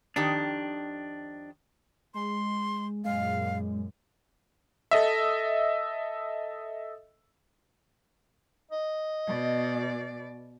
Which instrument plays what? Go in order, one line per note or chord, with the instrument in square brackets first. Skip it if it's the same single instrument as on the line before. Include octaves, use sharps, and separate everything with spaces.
[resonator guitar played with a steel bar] F2 D#3 G4 [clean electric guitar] D4
[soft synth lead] G#3 [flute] C6
[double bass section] F#2 A#2 [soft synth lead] G#3 [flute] F5
[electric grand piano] A4 D#5 E5
[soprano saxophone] D#5
[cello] B2 D5